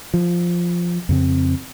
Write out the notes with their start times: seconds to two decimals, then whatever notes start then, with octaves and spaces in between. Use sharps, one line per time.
0.14 F3
1.09 F2 C#3 C4